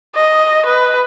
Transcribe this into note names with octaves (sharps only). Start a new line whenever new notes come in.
D#5
B4